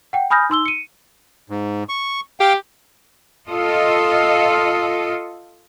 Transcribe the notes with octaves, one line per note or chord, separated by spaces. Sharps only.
F#5 G5
G#5 B5 D#6 F6 G6 A#6
D#4 C6 E6 G7
C#7 D#7
G#2
C#6
G4 F5 G5
F4 A4 D#5